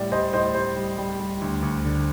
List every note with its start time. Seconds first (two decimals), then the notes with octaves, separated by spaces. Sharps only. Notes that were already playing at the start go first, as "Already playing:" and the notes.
Already playing: A2 G3 D5
0.12 G3 C5 D#5
0.33 A2 C5 D#5
0.54 G3 C5
0.76 G3
0.98 G3
1.20 G3
1.41 D2
1.62 D2
1.85 D3